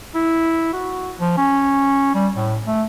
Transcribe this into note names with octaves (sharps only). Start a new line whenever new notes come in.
E4
F#4
F3
C#4
G3
A2
A3